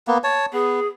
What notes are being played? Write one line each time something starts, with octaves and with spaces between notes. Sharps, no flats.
A#3 B3
C#5 A5
B3 G#4